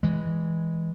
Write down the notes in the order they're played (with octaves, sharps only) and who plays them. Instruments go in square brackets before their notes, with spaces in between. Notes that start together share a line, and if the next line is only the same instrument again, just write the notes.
[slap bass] E3 G#3